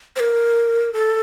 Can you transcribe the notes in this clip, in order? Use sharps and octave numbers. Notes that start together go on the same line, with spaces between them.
C5
A#4
A4